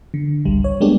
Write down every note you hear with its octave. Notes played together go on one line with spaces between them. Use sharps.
D3
G#1 C#2 G3
C#5
G3 G#3 A#3 B3 D4 G4